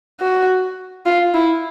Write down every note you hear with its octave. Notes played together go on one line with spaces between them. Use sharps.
F#4
F4
E4